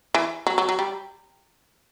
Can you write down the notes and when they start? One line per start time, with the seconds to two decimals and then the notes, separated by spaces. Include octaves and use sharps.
0.15 E3
0.47 F#3
0.58 F#3
0.69 F#3
0.79 G3